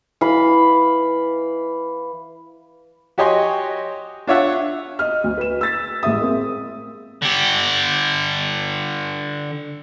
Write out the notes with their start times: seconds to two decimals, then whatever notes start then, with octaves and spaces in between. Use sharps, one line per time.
0.21 E3 F5 B5
3.18 F#4 G4 C#5 D#5 G#5 C6
4.27 D4 F4 C#5 E5 F#5
4.99 D#5 F6
5.24 D2
5.38 B4 E7
5.61 E6 A6 B6
6.03 A1 G#3 E5 D#6
6.21 A#3 C4 G#4
7.22 D3 G4